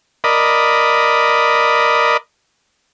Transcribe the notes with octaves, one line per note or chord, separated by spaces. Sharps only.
A#4 D5 D#5 B5